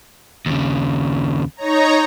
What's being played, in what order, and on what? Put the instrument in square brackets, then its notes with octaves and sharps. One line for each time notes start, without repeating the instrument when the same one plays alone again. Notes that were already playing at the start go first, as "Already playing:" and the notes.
[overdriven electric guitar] D#2 C#3
[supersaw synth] D#4 C#5 A#5